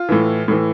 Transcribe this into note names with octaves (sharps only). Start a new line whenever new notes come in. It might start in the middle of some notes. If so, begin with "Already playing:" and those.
Already playing: F4
A2 E3
A2 E3